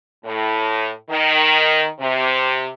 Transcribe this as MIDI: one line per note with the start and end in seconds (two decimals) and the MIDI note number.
0.24 0.91 45
1.09 1.87 51
2.00 2.69 48